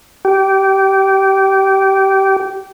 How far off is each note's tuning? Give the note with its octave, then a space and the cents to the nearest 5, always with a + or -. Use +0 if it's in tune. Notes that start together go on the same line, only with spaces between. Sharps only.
G4 -20